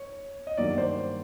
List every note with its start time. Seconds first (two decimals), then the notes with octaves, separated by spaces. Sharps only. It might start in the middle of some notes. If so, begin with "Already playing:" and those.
Already playing: C#5
0.47 D#5
0.57 G2 D#3 F#3 A#3 D5
0.78 C5